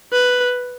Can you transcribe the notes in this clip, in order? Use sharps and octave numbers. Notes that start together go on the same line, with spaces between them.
B4